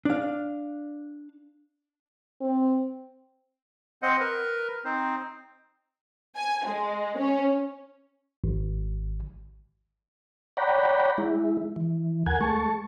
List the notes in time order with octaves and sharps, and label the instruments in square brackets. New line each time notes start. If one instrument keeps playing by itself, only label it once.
[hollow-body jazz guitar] D4 F5
[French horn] C4
[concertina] C4 C5 D#5 F#5
A#4 B4
C4 D#4 C5
[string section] G#5
G#3
C#4
[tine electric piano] G#1
[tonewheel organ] C#5 D5 F#5 G5 A#5 B5
G#3 E4
E3
D#2 A#4 F#5 G#5 G#6
G#3 A3 A5 C#6